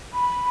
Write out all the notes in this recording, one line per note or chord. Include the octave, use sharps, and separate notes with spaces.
B5